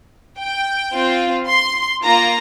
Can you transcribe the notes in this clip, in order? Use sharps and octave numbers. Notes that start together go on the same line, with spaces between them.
G5
C4 F4
C6
A#3 F4 A#5